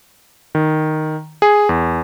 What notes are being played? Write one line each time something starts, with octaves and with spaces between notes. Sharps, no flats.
D#3
G#4
E2